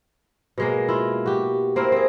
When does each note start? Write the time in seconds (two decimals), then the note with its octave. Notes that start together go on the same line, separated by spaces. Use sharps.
0.58 B2 G#3 A#3
0.89 E4 F4
1.26 F#4 G4
1.76 A#3 C4 E4 A#4
1.92 C4 G#4